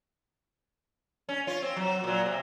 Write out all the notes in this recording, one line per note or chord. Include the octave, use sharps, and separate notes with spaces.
C#4
F4 C#5
C4
F#3
A#2 F#3
C3